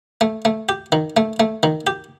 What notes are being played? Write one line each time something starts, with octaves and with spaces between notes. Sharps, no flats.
A3
A3
G4
D#3
A3
A3
D#3
G4